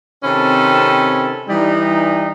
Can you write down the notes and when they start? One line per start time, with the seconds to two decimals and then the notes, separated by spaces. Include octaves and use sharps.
0.23 C3 D#3 C4 C#4 A4 B5
1.48 E3 G3 D#4